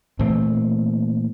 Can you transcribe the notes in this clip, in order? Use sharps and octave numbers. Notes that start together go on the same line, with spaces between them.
A#2 E3 A3 C4